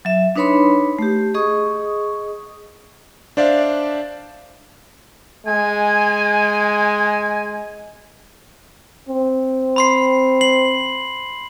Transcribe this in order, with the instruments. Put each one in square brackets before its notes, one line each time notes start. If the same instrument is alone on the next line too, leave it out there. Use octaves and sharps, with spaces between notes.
[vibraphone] F#3 E5
D4 D#4 B4 C#5 B5 C6
A3 G4
G#4 D#5 C#6 D#6
[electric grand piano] D4 C5 D5 E5 F5
[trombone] G#3 [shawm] G#5
[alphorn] C4
[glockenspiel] B5 C6 C7
C7 F#7